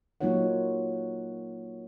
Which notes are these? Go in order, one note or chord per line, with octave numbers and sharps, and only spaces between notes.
F#3 A#3 D#4 F4 C#5 F#5